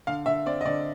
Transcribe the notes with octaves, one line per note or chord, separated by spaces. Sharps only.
D3 F5
D3 E5
C4 D5
D#5
D3 D5